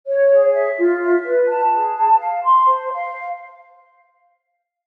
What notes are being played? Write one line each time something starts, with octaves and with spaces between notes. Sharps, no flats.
C#5
G#4
E5
F4
E5
B4
A5
G#4
A5
F5
C6
C5
F5